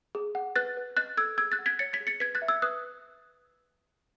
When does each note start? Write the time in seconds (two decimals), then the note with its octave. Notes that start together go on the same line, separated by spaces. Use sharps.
0.15 G#4
0.35 F#5
0.56 B4 F#6 A6
0.77 B4
0.97 D#5 F#6 A6
1.17 A4 E6 G#6
1.38 G#4 E6 G#6
1.52 F#6 A6
1.59 F#5
1.66 G#6 B6
1.79 C#5 A6 C#7
1.93 G#6 B6
2.00 G#4
2.07 A6 C#7
2.20 B4 G#6 B6
2.35 F#6 A6
2.42 E5
2.48 E6 G#6
2.62 B4 D#6 F#6